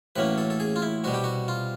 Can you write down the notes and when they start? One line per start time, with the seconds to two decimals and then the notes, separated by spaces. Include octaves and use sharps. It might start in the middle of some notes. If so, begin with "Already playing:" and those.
0.16 A1 A2 F#3 A#3 C#4 B4
0.38 A4
0.50 A4
0.60 G#4
0.76 F4
0.82 E4
1.04 C2 B2 G3 F#4
1.14 G4
1.24 F#4
1.48 F4